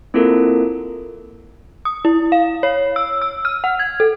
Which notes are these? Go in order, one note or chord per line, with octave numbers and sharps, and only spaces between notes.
A#3 C4 E4 F4 A4 A#4
D#6
E4
F5
C#5
E6
E6
F6
F#5
G#6
A4